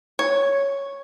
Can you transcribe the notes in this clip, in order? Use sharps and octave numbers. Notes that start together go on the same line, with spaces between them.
C#5